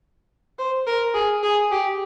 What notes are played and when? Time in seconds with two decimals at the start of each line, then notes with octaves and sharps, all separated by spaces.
0.59 C5
0.87 A#4
1.14 G#4
1.43 G#4
1.71 G4